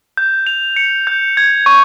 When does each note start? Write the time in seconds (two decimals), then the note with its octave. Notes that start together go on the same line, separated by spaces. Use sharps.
0.17 G6
0.47 F7
0.76 C#7
1.07 G6
1.37 G#6
1.66 C#6